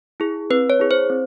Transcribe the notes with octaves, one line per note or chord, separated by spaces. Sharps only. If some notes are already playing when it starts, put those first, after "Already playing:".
E4 G#4
C4 B4
C#5
E4 G#4
C5
C4